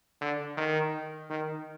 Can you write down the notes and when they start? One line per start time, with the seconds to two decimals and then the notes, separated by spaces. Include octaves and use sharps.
0.21 D3
0.57 D#3
1.30 D#3